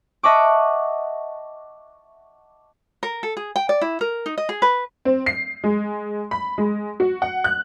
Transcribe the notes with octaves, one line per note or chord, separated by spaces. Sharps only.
D#5 E5 F#5 A5 C#6 D6
A#4
A4
G#4
G5
D5
E4
A#4
D#4
D#5
G#4
B4
C4
C7
G#3
B5
G#3
F#4
F#5
F#6